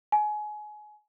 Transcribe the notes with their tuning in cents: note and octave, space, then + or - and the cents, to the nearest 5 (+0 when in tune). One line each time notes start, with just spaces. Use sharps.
G#5 +25